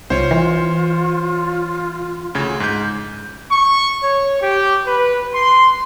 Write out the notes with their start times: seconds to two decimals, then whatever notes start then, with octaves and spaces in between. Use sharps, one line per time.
0.10 C2 F4 C5 C#5
0.31 E3
2.35 D2 C#3 G#6
2.60 G#2 G6
3.51 C#6
4.03 C#5
4.42 G4
4.86 B4
5.34 C6